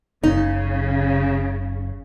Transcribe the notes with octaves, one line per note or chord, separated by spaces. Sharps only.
F#1 C#3 D#4